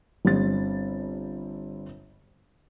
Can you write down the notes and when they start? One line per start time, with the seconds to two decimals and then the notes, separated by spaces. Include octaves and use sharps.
0.25 G1 G3 C4 A6